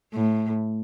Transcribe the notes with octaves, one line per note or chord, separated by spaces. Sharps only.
A2